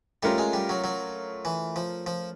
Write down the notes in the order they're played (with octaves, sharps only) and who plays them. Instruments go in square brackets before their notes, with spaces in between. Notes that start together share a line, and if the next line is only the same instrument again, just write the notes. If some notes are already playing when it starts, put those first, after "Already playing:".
[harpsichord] G3 [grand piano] A3 C#4 F4 A#4
[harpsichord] G#3
G3
F#3
F#3
E3
F3
F3